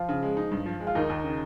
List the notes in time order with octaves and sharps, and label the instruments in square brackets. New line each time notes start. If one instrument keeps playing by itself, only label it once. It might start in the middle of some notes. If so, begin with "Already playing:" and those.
Already playing: [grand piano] F3 F4
[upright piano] C#3
G#3
D#4
G2
F3
G#3
[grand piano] F4
[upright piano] D#2 [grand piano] D#3 D#4
[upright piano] D#2
C#3